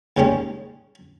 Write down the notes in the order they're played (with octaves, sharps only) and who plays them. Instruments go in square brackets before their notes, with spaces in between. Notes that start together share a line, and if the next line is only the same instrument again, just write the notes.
[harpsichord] D#2 C#3 G3 G#3 C#4